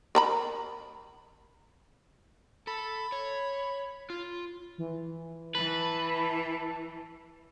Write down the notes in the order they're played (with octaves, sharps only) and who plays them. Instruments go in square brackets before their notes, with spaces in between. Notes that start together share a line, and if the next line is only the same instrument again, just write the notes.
[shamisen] A#4 A#5 B5
[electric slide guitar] A4 [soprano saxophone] B5
[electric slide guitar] C#5
F4
[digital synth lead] E3
[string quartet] E3 [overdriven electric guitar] B4 [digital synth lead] A5